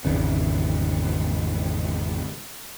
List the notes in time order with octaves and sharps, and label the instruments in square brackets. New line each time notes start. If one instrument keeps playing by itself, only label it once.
[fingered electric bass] G#1 E2 C#3